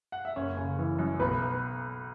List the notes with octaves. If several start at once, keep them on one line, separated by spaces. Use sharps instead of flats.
F#5
E5
F#1 C#4 C#5
C#3
E3
F#2
B1 B3 B4